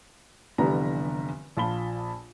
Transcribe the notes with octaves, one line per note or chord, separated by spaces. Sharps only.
F1 D3 E3 G3 B3 A#5
A#1 F4 A5 B5 G7